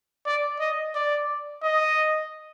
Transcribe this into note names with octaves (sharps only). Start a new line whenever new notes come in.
D5
D#5
D5
D#5